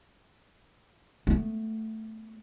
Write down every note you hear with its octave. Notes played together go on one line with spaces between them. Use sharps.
A3 B3